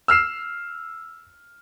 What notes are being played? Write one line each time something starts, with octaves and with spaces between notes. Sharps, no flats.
E6 F6 C7 E7